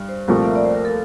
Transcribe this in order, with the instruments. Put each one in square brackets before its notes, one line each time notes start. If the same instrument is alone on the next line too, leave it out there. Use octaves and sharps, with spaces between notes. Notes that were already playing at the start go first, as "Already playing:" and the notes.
Already playing: [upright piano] G2
[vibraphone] C5
[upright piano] C2 A#2 F3 A3 [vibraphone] A#4
[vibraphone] E5
D5
C5
A#4
A4